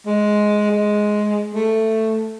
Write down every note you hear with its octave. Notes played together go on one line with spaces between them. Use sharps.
G#3
G#3
A3